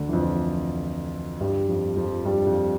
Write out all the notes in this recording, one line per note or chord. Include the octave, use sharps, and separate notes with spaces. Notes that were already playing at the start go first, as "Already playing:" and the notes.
Already playing: D2 D3
E3
F2 F3
G2 G3
F2 F3
F2 F3
G2 G3
F2 F3